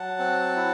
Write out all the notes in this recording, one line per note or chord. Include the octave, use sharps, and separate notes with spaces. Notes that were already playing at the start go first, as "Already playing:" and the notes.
Already playing: F#3 F#5 A5
C4
E4